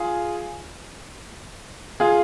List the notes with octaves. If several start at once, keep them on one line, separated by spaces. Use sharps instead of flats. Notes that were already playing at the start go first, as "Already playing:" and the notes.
Already playing: F4 G#4
F4 G#4